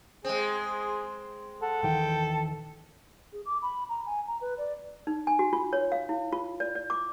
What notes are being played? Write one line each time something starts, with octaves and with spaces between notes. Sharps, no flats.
G#3 C4 G#4
A4 F#5
D#1 D#3 E3 G5
G#4
D6
B5
A#5
G#5
A#5
B4
D5
D#4
G#5
F#4
F4
C#5
F5
E4
F4
D5
D5
D6